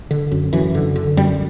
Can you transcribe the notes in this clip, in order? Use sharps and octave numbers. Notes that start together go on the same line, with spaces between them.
D3
F#2
F#2 E3
D3
D3
F#2 G3